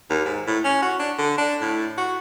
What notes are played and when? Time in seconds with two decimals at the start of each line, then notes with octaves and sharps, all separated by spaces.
0.10 D#2
0.25 G#2
0.47 A2
0.64 C#4
0.82 F#4
0.99 D4
1.18 D3
1.38 D4
1.61 A2
1.98 F#4